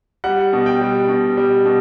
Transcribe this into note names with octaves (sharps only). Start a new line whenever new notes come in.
G3 F#5
B2
G5
G3
B2
G3
B2